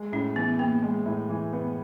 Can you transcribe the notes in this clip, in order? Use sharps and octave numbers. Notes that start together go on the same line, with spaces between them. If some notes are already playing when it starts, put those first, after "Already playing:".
Already playing: G#3
A2 C#4
E3 B3
A#3 B3
G#3
A2
E3
B3